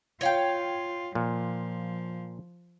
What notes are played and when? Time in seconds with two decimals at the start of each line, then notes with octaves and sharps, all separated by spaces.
0.21 F4 C#5 F5 G5
1.15 A#2 F3